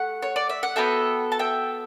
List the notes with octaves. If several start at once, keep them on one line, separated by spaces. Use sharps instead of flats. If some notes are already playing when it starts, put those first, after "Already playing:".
Already playing: A3 G4 F#5
C#5
D5
E5
F#5
B3 F#4 A4 E5 G5
A5
E5 G5